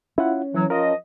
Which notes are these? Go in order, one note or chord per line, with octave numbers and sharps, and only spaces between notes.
C#4 E4 F4 F#5
E3 F#3
F3 F4 A#4 D#5